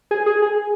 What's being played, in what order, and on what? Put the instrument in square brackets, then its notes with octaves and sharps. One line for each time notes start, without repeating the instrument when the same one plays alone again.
[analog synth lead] G#4
G#4
G#4